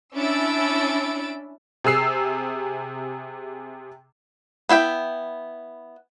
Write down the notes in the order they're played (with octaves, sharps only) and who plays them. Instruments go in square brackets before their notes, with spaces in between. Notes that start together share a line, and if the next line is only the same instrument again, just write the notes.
[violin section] C#4 D4 E4 E6 A6 D7
[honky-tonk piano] C3 G#4 E6 C7
[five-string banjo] B3 E4 F5 G5